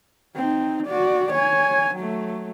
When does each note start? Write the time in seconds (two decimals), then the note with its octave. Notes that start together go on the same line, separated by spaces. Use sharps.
0.36 C4 D#4
0.88 F#4 D5
1.33 C#5 G#5
1.96 F#3 A3